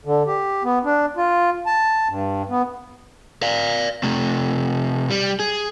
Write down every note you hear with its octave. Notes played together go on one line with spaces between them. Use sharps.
D3
G4
B3
D4
F4
A5
G2
B3
D5 F5
C3 A3
G3
G#4